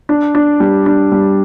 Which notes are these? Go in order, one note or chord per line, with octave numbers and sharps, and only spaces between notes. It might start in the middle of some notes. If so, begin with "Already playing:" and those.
D4
D4
G3
D4
G3